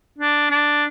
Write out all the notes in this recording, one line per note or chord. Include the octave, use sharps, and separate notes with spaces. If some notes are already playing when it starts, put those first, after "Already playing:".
D4
D4